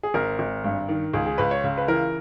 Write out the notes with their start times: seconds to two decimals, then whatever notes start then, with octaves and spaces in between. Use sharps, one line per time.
0.03 G#4
0.14 G#1 A#4
0.39 G#1
0.64 G2
0.89 D#3
1.14 C#2 G#4
1.26 G#4
1.38 C#2 B4
1.51 C#5
1.64 C#3
1.78 B4
1.88 E3 A#4